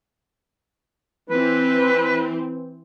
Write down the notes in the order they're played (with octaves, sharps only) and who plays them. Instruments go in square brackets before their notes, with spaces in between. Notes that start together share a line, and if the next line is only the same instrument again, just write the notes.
[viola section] E3 C4 [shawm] B4